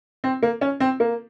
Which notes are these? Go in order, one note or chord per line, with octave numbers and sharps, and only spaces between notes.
C4
A#3
C#4
C4
A#3